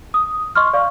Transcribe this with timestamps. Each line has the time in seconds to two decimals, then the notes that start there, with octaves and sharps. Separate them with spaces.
0.14 D#6
0.55 D#5 C6 C#6 F6
0.73 D5 F5 C#6